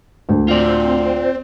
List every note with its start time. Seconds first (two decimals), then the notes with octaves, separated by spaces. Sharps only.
0.29 D2
0.48 C4 F4 D5